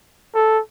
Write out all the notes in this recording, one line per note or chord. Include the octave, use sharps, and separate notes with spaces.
A4